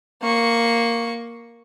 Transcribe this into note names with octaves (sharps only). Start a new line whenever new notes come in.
A#3 C#6